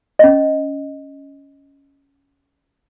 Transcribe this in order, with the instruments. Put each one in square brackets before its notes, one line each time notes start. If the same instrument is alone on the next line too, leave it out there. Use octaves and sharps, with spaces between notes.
[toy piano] C#4 D#5